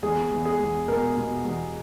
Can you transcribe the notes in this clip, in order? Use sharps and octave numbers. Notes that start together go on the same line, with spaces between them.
E2 G#4
E2
G#4
E2
B2 A#4
B2
E2